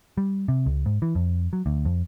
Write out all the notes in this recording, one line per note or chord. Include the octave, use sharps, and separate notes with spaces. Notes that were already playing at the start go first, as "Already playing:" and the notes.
G3
C3
C#2
G#2
E3
F2
F#3
D2
F2